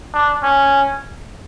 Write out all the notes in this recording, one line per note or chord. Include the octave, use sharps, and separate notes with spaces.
D4
C#4